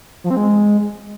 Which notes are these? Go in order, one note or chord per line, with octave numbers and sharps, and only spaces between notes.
F3
C4
G#3